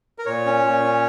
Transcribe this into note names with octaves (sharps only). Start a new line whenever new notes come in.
A#4
A#2 C#5
C#4
A#2
C#4